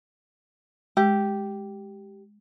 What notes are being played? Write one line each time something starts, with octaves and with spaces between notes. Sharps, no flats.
G#3 G4